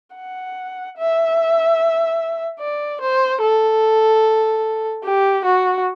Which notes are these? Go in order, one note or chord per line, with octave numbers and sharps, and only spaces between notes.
F#5
E5
D5
C5
A4
G4
F#4